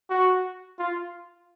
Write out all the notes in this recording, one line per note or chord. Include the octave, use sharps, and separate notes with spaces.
F#4
F4